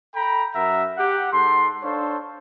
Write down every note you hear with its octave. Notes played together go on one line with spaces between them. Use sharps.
A4 G5 A#5 B5
F#2 A#4 E5 F#5 A#5
G4 F#5
G#2 A4 C6
D4 A4 C5 C#5 F5